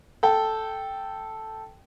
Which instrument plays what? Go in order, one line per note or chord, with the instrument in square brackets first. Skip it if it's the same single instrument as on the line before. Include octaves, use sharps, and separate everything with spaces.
[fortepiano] A4 G5